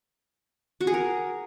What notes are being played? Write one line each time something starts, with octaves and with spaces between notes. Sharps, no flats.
F#4
G#4
A#4